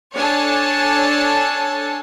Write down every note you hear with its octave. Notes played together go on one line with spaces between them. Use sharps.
D4 A4 C#5 G#5 A5